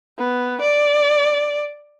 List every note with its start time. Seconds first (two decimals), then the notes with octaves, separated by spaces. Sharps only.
0.18 B3
0.61 D5